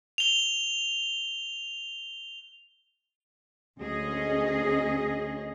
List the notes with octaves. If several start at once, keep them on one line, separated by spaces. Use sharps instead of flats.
F7 G7
D2 C#4 G#4 D#5